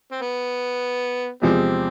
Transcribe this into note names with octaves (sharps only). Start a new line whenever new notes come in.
C4
B3
E2 C3 E3 F3 G#3 C4